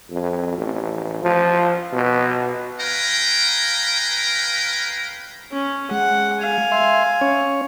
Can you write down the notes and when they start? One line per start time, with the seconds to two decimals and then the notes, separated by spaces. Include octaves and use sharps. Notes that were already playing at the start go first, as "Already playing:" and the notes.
0.11 F2
0.58 A1
1.22 F3
1.93 B2
2.80 B4 F5 G5 G#5 A#5
5.52 C#4
5.91 G#3 F#5
6.41 F5 G#5
6.72 E5 C6
7.21 C#4 C#5